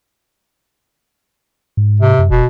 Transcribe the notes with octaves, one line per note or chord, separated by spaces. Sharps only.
G#2
C3
F#2
F1 B2